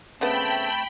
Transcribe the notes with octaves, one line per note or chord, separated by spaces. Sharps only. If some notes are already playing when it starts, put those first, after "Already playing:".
C#3 A3 B3 C4 G5 A5 B5